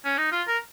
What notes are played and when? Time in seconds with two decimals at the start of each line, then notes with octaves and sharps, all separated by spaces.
0.05 C#4
0.18 D#4
0.32 F4
0.48 A#4